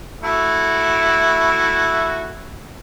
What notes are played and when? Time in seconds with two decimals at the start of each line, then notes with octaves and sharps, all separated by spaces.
0.23 A3 E4 F#4